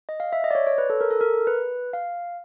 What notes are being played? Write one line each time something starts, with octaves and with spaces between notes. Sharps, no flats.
D#5
F5
E5
D#5
D5
C#5
C#5
B4
A4
A#4
A4
A#4
B4
F5